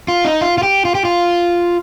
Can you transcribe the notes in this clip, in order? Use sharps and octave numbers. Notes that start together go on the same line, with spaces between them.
F4
D#4
F4
F4
G4
F4
G4
F4